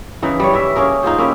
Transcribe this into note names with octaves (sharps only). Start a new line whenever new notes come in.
C#3 E3 D#4
G3 C#5
E3 E5
A#3 C#4 G#4 A#4
D#4 F4 G#4 C5
A#3 C#4 E4 G4